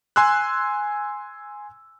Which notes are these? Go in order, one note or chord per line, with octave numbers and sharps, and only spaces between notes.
G#5 C6 E6 F#6